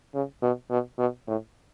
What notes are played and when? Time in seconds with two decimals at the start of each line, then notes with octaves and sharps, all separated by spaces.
0.14 C#3
0.42 B2
0.70 B2
0.98 B2
1.27 A2